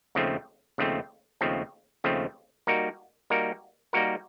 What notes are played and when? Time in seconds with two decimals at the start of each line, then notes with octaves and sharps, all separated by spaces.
0.15 D#2 C#3 F3 A3 C4
0.78 D#2 C#3 F3 A3 C4
1.41 D#2 C#3 F3 A3 C4
2.04 D#2 C#3 F3 A3 C4
2.67 G3 A#3 D#4 F#4 A#4
3.30 G3 A#3 D#4 F#4 A#4
3.93 G3 A#3 D#4 F#4 A#4